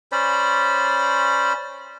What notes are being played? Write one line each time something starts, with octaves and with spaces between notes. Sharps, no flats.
C#4 C5 D5 B5